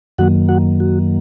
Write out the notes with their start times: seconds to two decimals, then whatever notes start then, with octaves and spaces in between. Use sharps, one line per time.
0.18 F#2 D#3 F#3 A#3 F#4 F#5
0.49 F#4 F#5
0.80 F#4